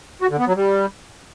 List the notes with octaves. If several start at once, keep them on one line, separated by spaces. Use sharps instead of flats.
F#4
D3
B3
F#3
G3